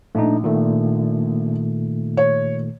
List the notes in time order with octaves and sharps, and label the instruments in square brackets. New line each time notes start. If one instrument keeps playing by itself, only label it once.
[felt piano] A#1 [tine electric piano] A3 D4 D#4
[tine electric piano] A#2 D#3 A3
[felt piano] C#5